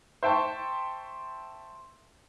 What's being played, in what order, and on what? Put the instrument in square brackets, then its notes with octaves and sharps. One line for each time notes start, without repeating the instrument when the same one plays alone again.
[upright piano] C5 E5 G5 A5 C#6